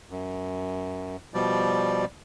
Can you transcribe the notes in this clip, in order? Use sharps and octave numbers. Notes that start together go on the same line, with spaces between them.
F#2
B2 F3 G3 D5